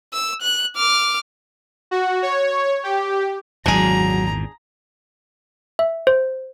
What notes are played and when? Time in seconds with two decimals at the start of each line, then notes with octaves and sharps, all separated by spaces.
0.13 E6
0.42 F#6
0.76 D6 F6
1.91 F#4
2.22 C#5
2.84 G4
3.66 G#1 E2 A#2 F#3 D4 G#4 A#5
5.79 E5
6.07 C5